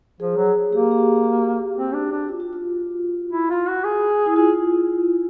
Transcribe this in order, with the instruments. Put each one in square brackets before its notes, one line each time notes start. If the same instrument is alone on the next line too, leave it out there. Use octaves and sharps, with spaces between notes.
[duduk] F3 [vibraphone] G#4
[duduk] F#3
[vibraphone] G#4
[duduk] A#3 [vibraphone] G4
[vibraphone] G4
F#4
G4
F#4
[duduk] C4
D4
D4
[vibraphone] F4
F#4
F4
[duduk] E4
F4
F#4
G#4
[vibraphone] E4
[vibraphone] F4 [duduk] G#4